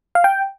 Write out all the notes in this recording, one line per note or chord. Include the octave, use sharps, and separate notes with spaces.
F5
G5